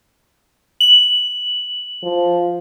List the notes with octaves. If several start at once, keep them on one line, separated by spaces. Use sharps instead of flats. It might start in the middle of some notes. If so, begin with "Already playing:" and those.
F#7
F3